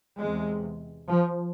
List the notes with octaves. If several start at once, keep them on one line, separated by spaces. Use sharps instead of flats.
E2 C3 G#3
F3